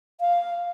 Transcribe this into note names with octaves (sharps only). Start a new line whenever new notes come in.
F5